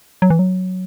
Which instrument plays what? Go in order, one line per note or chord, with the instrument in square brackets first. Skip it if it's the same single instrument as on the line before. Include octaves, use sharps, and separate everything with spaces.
[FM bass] F#3
E3
F#3